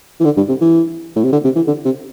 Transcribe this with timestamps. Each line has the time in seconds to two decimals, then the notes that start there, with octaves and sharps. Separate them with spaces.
0.20 E3
0.25 D3
0.37 G2
0.49 C3
0.61 E3
1.16 A2
1.24 C3
1.32 D3
1.44 C3
1.56 E3
1.67 D3
1.85 C3